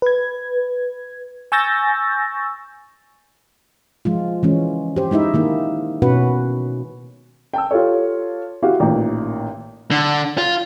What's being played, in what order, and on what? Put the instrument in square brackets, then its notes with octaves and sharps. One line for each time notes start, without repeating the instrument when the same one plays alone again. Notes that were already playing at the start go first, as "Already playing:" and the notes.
[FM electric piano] B4 G#6
G#5 C#6 E6 G6 A6 A#6
[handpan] F3 G#3 F4
E3 G#3 C#4
G4 C5
G#3 D#4 E4 E5
D#3 A#3 D#4
B2 C#4 F#4 B4 F#5
[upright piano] G5 A5 E6
F4 G4 A4 C#5
E4 F#4 G4 F5
A1 A#2 D#3 G5 A#5
[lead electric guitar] D3
F4